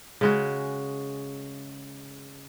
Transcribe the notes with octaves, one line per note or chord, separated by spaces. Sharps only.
C#3 G#3 F#4